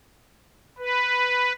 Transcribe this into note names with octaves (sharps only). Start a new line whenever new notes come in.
B4